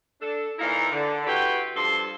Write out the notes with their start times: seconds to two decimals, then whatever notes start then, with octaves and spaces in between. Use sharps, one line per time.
0.21 D4 A4
0.59 A#2 E3 D#4 E4 F5 A#5
0.91 D3
1.26 E4 F#4 G4 B4 G5 C6
1.76 G2 F3 A4 C6